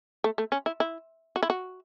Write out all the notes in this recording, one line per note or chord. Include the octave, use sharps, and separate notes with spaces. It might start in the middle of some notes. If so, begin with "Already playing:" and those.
A3
A3
C#4
E4
E4
F#4
E4
F#4